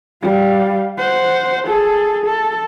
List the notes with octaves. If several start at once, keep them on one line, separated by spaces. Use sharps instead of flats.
G3 F5
C5 F#5
G#4 A4
A4